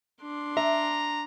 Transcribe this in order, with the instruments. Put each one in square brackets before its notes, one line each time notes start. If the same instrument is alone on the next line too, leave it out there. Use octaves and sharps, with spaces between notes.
[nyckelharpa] D4 C6
[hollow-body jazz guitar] E5 [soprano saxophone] A#5